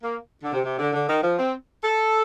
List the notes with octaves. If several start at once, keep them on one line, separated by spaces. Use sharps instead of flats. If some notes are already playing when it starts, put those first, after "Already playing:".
A#3
D3
C3
C3
D3
D3
D#3
F3
C4
A4